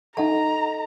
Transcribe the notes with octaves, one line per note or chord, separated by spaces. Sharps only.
D#4 A4 D#5 F#5 A5 A#5